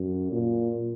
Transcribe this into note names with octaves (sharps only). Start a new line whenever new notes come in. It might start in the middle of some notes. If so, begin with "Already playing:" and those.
Already playing: F#2
A#2